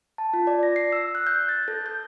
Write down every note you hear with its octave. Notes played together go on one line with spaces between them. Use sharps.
A5
F4
D5
A#6
C7
E6
F#6
G6
A6
A4
G6